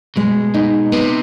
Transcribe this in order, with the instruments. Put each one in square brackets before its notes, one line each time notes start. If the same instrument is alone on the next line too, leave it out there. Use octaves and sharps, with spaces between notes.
[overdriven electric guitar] B2 [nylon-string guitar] G#3
[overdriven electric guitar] B2 [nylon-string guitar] D#4
[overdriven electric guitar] C3 [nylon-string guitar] B3